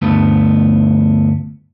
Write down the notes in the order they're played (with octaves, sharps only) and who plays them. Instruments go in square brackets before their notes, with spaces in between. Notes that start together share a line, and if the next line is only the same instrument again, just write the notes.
[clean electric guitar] D2 G2 A3 B3